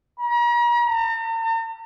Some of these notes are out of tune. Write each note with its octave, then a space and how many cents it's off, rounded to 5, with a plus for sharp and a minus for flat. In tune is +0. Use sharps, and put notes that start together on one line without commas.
A#5 +40
A#5 -45